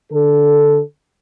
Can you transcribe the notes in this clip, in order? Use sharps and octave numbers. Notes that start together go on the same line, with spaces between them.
D3 A4